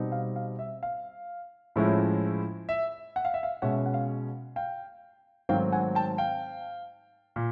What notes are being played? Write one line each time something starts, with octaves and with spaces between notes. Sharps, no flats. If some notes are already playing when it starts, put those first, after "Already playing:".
Already playing: B2 G3 C4 D#4
F5
F5
E5
F5
A2 F3 G#3 C#4 E4
E5
F#5
F5
E5
F5
B2 G#3 C#4 E5 F#5
F#5
F5
F5 G5
G#2 D#3 F#3 A3 C4 F5 G5
F#5 G#5
G5 A5
F5 G5
A#2